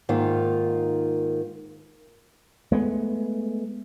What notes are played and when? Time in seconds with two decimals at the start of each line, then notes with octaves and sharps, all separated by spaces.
0.09 G#2 D#3 A#3 D#4 F4
2.72 G#3 A3 B3